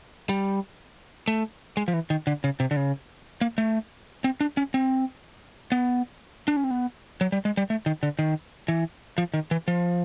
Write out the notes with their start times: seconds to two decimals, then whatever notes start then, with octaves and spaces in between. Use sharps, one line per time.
0.29 G3
1.28 A3
1.77 G#3
1.88 F3
1.94 E3
2.10 D#3
2.27 D3
2.44 C#3
2.60 C3
2.71 D3
2.76 C#3
3.41 A#3
3.58 A3
4.24 C4
4.41 D4
4.57 C#4
4.74 C4
5.72 B3
6.48 D4
6.56 C#4
6.64 C4
6.71 B3
7.21 F#3
7.32 G3
7.45 G#3
7.57 G3
7.70 A3
7.86 D#3
8.03 D3
8.19 D#3
8.68 E3
9.18 F3
9.34 D#3
9.51 E3
9.68 F3